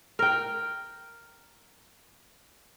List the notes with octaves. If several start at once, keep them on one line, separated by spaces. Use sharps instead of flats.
A#4 G5